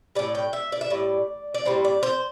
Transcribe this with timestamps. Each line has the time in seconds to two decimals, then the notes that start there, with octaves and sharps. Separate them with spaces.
0.15 A2 G3 D5
0.35 G5
0.53 E5
0.72 D5
0.81 E5
0.90 A2 G3 D5
1.54 D5
1.65 A2 G3 C5
1.85 D5
2.03 C5